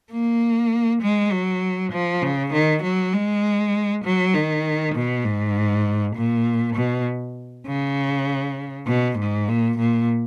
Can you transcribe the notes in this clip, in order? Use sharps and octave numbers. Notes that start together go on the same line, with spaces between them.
A#3
G#3
F#3
F3
C#3
D#3
F#3
G#3
F#3
D#3
B2
G#2
A#2
B2
C#3
B2
G#2
A#2
A#2